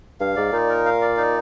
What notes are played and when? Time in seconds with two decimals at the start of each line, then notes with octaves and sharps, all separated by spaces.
0.20 G2 F5
0.36 G#2 D5
0.52 A#2 D#4
0.69 A#4
0.86 F5
1.01 D5
1.17 D#4